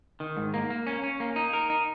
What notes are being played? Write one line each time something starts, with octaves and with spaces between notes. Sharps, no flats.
D#3
G#2
A#3
A#3
C#4
C#4
A#3
D#4
A#4
D#4